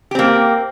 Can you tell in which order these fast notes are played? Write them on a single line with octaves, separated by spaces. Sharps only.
G4 C4 A#3